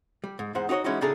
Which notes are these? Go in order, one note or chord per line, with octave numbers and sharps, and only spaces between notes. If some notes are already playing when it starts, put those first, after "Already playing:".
G3
G#2
E2 G#2 C5 F#5
D#4 F#4 G4 C#5 D#5
E3 G#3 C#4 D#4 E4 F#4
A2 C#3 A3 D4 G#4 A#5